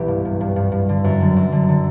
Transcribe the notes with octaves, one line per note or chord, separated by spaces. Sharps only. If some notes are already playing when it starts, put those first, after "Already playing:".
Already playing: C2 B2 E3 G4
G2
G2
G2
G2
G2
D3
F#2
D3
F#2
D3
D3